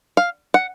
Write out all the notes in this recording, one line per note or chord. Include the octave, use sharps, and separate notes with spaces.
F5
F#5